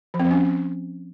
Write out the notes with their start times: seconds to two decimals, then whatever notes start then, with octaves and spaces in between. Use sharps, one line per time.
0.14 F3
0.20 C4
0.25 F3
0.31 C#4